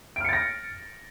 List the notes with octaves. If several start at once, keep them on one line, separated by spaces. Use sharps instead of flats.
F6 A6 A#6 C#7 D7